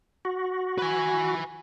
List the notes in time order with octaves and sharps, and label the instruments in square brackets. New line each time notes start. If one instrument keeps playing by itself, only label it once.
[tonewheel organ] F#4
[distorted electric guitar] B4 G#5